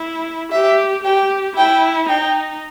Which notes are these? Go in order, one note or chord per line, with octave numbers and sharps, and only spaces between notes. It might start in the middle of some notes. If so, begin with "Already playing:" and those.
Already playing: E4
G4 E5
G4 G5
E4 G5
D#4 G5